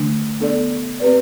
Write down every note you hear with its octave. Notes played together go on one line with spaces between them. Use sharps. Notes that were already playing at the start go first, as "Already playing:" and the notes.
Already playing: D3 A3 D4
B3 D4 A4 D5
C4 G4 B4 D5